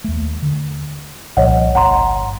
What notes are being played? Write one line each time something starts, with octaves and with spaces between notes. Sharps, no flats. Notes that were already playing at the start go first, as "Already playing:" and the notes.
D#2 A3
D3
C2 A#2 F3 C#5 D#5 F#5
G1 F#5 A#5 C6